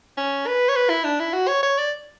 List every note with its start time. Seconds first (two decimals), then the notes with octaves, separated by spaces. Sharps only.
0.17 C#4
0.47 B4
0.69 C#5
0.76 B4
0.90 E4
1.04 D4
1.20 E4
1.33 F#4
1.48 C#5
1.63 C#5
1.78 D5